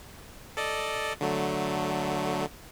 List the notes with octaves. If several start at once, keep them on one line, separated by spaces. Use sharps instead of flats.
A4 D5 D#5
D3 F#3 A3